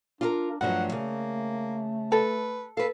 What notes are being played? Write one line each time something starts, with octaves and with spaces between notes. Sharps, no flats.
D4 F4 F#4 A#4
G2 F3 F#3 A3 F#5
C#3 A#3
A4 B4
A4 B4 F5